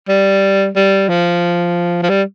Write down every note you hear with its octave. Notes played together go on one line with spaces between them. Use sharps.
G3
G3
F3
F3
G3